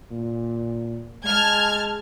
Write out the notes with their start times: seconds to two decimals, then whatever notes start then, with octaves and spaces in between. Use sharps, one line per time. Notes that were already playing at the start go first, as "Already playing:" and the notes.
0.11 A#2
1.24 G#3 A5 F6 G#6